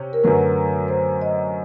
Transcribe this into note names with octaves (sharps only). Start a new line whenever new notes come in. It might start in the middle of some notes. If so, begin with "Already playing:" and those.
Already playing: C3 C#4
A#4
F#2 D3 F#3 A3 B4
C5
D#5